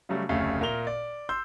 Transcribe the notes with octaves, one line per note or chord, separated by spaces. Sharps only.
C#3 F#3 G3 A3
F1 D2 C#3 A3 F5
A#2 A#4 E5 F7 G7
D5
C6 E6 G6